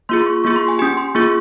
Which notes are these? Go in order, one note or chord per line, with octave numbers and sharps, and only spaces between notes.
A#3 F4 G#4 C6
C#6
A#3 F4 G#4 C#6
C6
G#5
C#4 G4 G#5
C6
A#3 F4 G#4 C#6